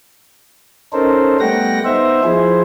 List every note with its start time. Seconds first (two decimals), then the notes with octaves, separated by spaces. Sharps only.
0.93 C#4 D#4 A4 A#4 C5
1.40 G3 A3 B3 F#5 G5 A#6
1.85 B3 D#4 C5 E5
2.24 F3 E4 G#4 C5